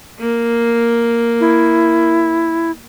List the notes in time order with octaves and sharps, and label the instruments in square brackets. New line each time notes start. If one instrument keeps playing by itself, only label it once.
[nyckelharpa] A#3
[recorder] E4